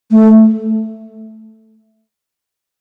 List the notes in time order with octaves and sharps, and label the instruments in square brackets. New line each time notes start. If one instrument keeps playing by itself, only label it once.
[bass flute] A3